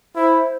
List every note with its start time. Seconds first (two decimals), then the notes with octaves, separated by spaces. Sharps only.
0.16 E4 C5